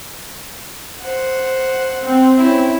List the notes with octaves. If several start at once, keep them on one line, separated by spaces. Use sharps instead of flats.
C5 F#5
C4
C#4 E4